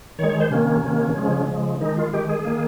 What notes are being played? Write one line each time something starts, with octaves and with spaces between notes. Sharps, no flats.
D#3 G#3 C#5
C#5
C5
C3 D#3 A#3 C#4
C3 D#3 A#3
C#3 F3 G#3
C#3 F3 G#3
D#3 G#3 D#4
F4
D#3 G#3 G4
G#4
D#3 A#3